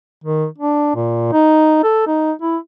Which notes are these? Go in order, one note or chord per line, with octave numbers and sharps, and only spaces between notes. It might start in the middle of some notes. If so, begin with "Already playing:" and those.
D#3
D4
A#2
D#4
A4
D#4
E4